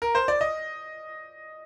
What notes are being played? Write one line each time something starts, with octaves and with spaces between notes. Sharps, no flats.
A#4
C5
D5
D#5